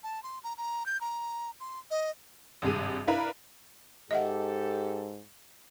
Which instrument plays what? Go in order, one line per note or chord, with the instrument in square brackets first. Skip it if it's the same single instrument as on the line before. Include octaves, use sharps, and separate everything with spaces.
[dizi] A5
C6
A#5
A#5
G6
A#5
C6
D#5
[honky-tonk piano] G#1 G2 C3 G#4 D#7
D4 E4 A#4 B4 F5 A#5
[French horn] G#2 [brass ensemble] G4 A4 [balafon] D#5 E5 F#5